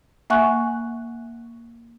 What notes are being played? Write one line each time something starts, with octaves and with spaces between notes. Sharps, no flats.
A#3 E5 F#5 G#5 C#6 F#6